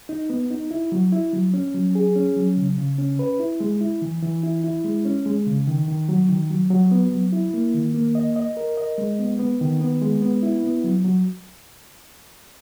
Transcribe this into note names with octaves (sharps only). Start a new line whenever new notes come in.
D#4
B3
D#4
E4
F#3
E4
F#3
C#4
F#3
G#4
C#4
F#3
C#3
C#3
C#4
B4
E4
G#3
E4
E3
E3
E4
E4
G#3
C#4
G#3
C#3
D#3
D#3
F#3
D#3
F#3
F#3
B3
F#3
E4
A#3
D#3
A#3
D#5
D#5
A#4
D#5
G#3
B3
B3
D#3
B3
G#3
B3
E4
B3
F#3
F#3